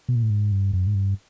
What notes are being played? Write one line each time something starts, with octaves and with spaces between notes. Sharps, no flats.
B2
A#2
A2
G#2
G2
F#2
G#2
G2